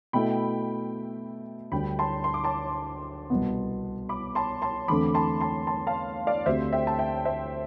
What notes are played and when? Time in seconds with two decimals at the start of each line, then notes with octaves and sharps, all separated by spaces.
0.13 B2 A3 E4 G5 B5
1.72 D2 D3 G3 D4 G5 B5
1.99 A5 C6
2.24 C6
2.34 D6
2.44 A5 C6
3.30 C2 B2 B3
4.09 B5 D6
4.35 A5 C6
4.62 A5 C6
4.88 E2 D3 A3 C4 B5 D6
5.14 A5 C6
5.40 A5 C6
5.67 A5 C6
5.87 F5 A5
6.27 D5 F5
6.46 D2 D3 A3 C4 G4 C5 E5
6.72 E5 G5
6.87 A5
6.99 E5 G5
7.25 C5 E5